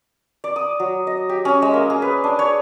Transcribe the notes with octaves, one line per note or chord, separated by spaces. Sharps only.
D5
D#6
F#3
D#5
G4
C#4
G#3
A#3
G#4
B4
D4
C#5